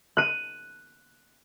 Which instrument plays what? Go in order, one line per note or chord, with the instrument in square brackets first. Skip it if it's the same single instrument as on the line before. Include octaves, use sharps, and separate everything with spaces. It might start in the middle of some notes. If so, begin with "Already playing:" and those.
[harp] F#6 D#7